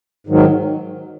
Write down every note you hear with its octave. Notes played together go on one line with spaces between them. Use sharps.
G#2 D#3 F#3